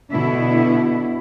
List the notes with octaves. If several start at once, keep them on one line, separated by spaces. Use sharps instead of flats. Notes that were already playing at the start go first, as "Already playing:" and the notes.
B2 D3 E4